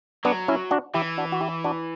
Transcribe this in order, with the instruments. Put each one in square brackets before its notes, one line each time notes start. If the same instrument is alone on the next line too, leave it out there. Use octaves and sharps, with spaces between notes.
[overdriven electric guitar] F#3 [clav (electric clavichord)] B3 D4
[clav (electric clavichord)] C#4 E4
D4 F#4
[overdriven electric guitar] E3 [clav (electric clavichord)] E4 G4
[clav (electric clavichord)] D4 F#4
F#4
E4 G4
D4 F#4